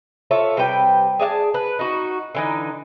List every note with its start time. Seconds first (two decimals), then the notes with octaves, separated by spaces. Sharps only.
0.31 F4 A4 C#5 E5
0.57 C3 G3 B4 G5
1.19 G#4 D5 E5 A5
1.54 B4
1.79 D#4 F#4
2.35 D3 E3 D#4